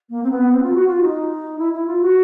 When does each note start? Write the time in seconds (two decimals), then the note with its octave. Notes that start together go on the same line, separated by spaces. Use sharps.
0.10 A#3
0.23 C4
0.31 B3
0.52 C4
0.63 F4
0.74 F#4
0.87 F4
1.02 D#4
1.59 E4
1.73 E4
1.87 F4
2.02 F#4